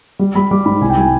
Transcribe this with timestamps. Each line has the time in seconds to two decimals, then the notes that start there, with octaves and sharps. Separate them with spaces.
0.19 G3
0.35 G3 B5
0.51 G3 D6
0.65 G#2 B5
0.81 C2 G#5
0.90 G5
0.97 G3 G#5